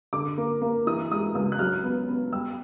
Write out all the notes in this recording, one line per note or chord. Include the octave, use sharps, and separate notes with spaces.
D3 D6
A#3
A#3
E3 D#6
G#3 D#6
C#2 D#6
F#6
F#3 F6
B3
B3
G3 E6